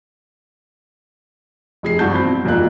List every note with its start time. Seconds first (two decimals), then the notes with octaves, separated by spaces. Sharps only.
1.83 F1 G#4 C7
1.99 G2 E3 F#4 A5 G6
2.11 C4 B5 G6
2.26 B2
2.45 E1 B1 A#2 F3 A#3 F#6